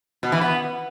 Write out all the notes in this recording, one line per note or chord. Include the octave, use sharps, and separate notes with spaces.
B2
E3
B3